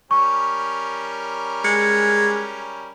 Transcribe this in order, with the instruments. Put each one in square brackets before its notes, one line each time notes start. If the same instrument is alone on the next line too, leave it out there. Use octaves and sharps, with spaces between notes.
[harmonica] G3 C#4 A#4 [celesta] C#6
[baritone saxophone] G#3 [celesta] C#7